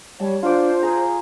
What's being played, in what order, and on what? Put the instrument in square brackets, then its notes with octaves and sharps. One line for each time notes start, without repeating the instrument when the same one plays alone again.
[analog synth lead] G3 [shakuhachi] C#5 [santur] A5
[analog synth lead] D4 [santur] F4 D6 [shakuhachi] C5
[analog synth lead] G#4 [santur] A#5